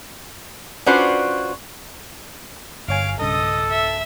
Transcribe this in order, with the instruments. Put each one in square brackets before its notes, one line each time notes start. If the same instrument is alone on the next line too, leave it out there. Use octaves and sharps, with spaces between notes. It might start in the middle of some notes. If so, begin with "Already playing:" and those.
[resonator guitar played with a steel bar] C#4 D4 F4 F#4 B4 C5
[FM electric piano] G1 C#5 G#5 [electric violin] F5 D7
[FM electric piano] B1 G2 C#3 [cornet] A4 [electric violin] D#5 D#6
[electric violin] E5